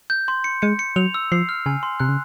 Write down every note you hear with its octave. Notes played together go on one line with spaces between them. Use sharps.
G6
C6
C#7
G#3 C#7
C#7
F#3 F7
E6
F3 C7
F6
C#3 G#5
C6
C3 F#6
C#3